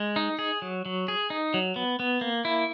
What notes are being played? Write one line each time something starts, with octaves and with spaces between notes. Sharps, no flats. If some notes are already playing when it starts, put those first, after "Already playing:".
Already playing: G#3
D#4
G#4
F#3
F#3
G#4
D#4
F#3
B3
B3
A#3
E4